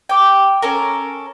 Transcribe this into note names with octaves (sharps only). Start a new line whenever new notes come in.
G5 D6
C#4 A4 A#4